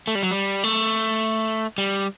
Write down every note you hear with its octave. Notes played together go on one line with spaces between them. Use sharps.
A3
G3
F#3
G3
A3
G3